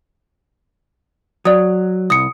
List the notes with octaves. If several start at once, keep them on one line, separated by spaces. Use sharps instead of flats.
F#3 D5 D#6
C2 D#6 C#7